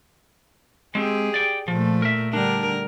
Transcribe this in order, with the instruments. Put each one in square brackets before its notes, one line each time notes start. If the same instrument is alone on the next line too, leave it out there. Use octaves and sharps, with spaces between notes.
[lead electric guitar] G#3 C4 [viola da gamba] G4 G#4
[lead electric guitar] D5 G5
[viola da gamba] A#2 A3 [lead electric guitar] F3
[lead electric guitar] A#4 E5
[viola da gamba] D3 G3 A#4 [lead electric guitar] D4